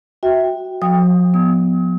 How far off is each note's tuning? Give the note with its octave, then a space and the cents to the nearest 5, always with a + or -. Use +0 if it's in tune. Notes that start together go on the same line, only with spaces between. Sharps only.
F#4 +0 E5 -15 G5 +0
F3 +45 G5 +20 D#6 +0
B3 +0 D#6 +40